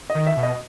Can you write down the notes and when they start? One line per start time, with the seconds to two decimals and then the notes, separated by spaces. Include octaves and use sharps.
0.10 D#5
0.15 D#3
0.27 E5
0.37 B2
0.43 D#5